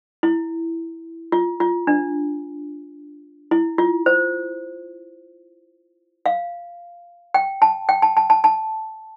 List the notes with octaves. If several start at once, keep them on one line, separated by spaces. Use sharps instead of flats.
E4
F4
F4
D4
E4
F4
C5
F5
G5
A5
G5
A5
A5
A5
A5